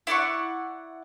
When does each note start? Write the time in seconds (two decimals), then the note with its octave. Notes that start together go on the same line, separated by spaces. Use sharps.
0.07 E4 D5 F#5 C#6